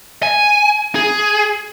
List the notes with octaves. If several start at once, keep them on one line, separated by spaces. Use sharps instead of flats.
G#5
G#4